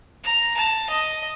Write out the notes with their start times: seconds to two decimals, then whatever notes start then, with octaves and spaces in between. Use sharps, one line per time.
0.24 A#5
0.56 A5
0.89 D#5